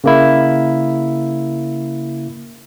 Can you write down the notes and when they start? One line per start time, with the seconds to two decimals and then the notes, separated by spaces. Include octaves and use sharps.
0.04 C#3 A#3 E4